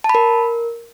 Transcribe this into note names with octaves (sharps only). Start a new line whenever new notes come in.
A5
B5
A#4